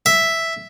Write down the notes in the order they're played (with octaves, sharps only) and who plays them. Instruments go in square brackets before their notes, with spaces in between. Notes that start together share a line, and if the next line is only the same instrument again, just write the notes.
[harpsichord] E5